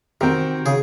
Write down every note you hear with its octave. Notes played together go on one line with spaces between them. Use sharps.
C3 D#3 C4 F#4 A#4
C#3 G#4